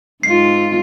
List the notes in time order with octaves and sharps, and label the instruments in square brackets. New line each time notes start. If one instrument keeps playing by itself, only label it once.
[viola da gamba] G#2 F4 [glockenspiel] C7